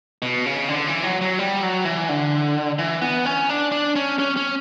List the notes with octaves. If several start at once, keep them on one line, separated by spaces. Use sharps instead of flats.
B2
C#3
D3
E3
F#3
F#3
G3
F#3
E3
D3
E3
B3
C#4
D4
D4
C#4
C#4
C#4